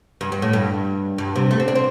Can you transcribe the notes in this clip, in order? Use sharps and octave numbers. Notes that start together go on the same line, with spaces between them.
G2
G2
A2
G2
G2
C3
A3
C4
D4
C4